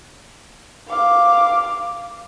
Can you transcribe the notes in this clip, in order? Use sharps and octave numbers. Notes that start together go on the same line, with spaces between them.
F5 D6